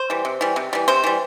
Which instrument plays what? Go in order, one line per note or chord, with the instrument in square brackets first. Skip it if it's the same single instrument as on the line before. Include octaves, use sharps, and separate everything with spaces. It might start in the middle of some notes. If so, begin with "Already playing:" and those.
Already playing: [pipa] C5
E3 G3
C3
E3 G3
C3
E3 G3
C3 C5
E3 G3